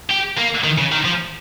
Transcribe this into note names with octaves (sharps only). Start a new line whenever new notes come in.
G4
A#3
D#3
C#3
D#3
F3